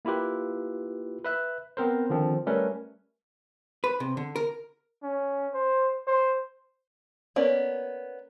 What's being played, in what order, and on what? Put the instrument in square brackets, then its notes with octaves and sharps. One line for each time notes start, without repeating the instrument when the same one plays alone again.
[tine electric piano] A#3 E4 F4 G4 B4
B4 E5 F#6
B3 C4 A#4 C5
D3 D#3 F3 C4
G3 A3 C#4 A#4 B4
[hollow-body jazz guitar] B4
C3
D3
A#4
[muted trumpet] C#4
C5
C5
[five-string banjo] A#3 B3 C#4 D5